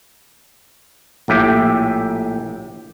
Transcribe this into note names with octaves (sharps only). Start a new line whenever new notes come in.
A#1 A2 G4 E5 G5